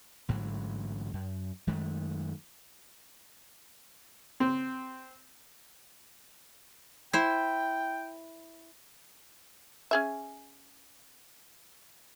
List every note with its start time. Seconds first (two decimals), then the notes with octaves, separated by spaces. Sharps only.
0.29 A1 G#2 D3 F#3
1.14 F#2
1.67 F#2 D#3 G#3 A3
4.40 C4
7.13 E4 C5 G5
9.91 C#4 G#4 E5